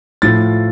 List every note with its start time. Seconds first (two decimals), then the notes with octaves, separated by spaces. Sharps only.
0.22 A2 F3 A6